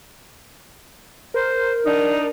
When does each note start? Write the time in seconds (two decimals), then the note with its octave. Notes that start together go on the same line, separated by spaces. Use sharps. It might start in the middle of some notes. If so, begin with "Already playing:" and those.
1.34 A#4 C5
1.84 D4 D#4